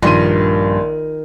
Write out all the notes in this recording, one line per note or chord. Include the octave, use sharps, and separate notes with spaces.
A#1 G2 D#3 C6 D#7